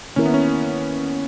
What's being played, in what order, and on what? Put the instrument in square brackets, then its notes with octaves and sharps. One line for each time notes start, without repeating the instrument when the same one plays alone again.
[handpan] D#3 A#3 E4 A#4 [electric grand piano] C#4
[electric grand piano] B3
C#4